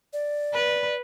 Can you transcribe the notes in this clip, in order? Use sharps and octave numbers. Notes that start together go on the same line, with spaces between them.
D5
B4